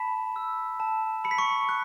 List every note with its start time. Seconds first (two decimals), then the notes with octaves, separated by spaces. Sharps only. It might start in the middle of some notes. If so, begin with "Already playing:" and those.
Already playing: A5 B5 B6
0.36 E6
0.80 A5
1.24 B5 C#7
1.31 B6
1.38 C#6 C#7
1.69 F#6